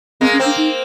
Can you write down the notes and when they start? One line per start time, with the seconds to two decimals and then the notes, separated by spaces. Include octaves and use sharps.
0.21 G#3 A#3 C4
0.33 C#4
0.39 A#3 C4
0.45 D4
0.57 D#4